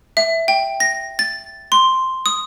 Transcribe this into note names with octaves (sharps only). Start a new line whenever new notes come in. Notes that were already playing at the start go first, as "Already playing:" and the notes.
E5
G5
A#6
A6
C6
D#6